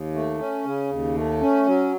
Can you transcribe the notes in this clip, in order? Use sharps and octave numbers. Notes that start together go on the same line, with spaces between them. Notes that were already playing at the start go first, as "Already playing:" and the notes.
Already playing: D#2
A3
C#4
C#3
D#2
A3
C#4
F#3